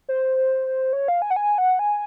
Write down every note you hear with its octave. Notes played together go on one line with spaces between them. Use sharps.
C5
C#5
F5
G#5
F#5
G#5
F#5
G#5